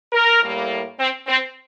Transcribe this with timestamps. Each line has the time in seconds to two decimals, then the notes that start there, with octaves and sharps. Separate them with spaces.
0.13 A#4
0.43 A2 G3 A#3
0.99 C4
1.27 C4